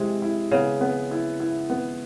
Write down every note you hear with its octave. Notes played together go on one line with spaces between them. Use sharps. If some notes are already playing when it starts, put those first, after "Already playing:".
Already playing: C3 G#3 E4
E4
C#3 B3
B3
E4
E4
B3